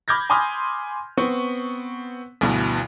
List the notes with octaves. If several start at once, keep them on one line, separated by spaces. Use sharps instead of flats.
B5 D6 F6 G6 G#6 A#6
G#5 B5 C6 D6 D#6 F6
B3 C4 C#6
D2 G2 B2 E3